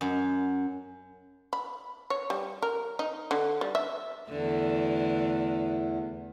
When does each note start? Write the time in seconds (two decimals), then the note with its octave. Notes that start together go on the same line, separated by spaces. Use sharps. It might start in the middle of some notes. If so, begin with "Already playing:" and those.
0.01 F#2
1.53 B5
2.10 C#5
2.30 G3
2.62 A#4
2.99 D#4
3.31 D3
3.61 G3
3.75 E5
4.30 E2 D3 E3 A3